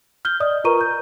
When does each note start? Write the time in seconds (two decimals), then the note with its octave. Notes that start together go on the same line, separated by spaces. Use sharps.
0.25 F6 G6 G7
0.40 D5 D#5 D#6
0.64 F4 A#4 B4 A#5 C#6 D#7
0.81 G6